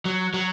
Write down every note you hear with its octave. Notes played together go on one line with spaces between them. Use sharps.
F#3
F#3